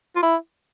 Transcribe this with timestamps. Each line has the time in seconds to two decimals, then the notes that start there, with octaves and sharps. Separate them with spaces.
0.16 F4
0.23 E4